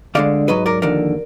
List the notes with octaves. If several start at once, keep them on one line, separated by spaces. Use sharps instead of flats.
D2 D3 G#3 D5 F5
G#2 F#3 B4 D#5
A#4 D5
D#2 D3 F3 A#4 D5